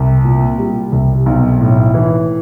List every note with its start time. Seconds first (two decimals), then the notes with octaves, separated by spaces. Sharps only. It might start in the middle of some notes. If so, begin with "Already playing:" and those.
Already playing: C2
0.24 A#2
0.58 G3
0.92 C2
1.26 B1
1.60 A2
1.94 E3